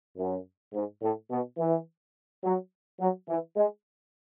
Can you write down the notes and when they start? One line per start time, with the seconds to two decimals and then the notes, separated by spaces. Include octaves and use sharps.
0.17 F#2
0.73 G#2
1.02 A2
1.30 B2
1.58 E3
2.44 F#3
3.00 F#3
3.28 E3
3.56 G#3